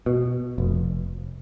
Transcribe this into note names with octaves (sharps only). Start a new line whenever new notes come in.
B2
F1